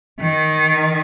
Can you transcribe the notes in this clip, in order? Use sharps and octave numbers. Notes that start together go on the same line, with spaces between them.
D#3